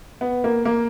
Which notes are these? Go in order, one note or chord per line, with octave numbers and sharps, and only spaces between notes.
B3
A#3
A#3